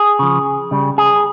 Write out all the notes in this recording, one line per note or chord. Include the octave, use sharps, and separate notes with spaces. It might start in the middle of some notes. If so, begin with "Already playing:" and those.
Already playing: G#4
C#3 F3
C#3 G3
G#4